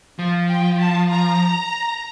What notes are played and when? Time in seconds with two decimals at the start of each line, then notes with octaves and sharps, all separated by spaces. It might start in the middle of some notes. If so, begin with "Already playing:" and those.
0.19 F3
0.48 G5
0.79 A5
1.10 A#5